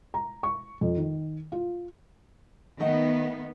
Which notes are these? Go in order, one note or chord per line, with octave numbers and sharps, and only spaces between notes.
A#5
C#6
F2
D#3
F4
D#3 A3 B3 D#5 F#5